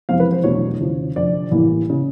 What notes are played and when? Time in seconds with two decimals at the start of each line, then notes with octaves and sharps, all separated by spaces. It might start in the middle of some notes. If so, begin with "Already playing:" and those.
0.09 F2 C3 E3 G#3 C4 F5
0.20 B4
0.33 C5
0.44 E2 B2 F#3 A3 D4 C#5
0.80 F1 D#2 C#3 F3
1.16 F1 F2 D3 D5
1.51 A1 A2 E3 G3 A#3
1.90 C#3